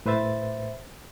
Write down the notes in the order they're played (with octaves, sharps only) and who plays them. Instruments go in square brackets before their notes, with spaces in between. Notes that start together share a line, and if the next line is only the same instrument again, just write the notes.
[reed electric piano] A2 B4 C5 E5 A6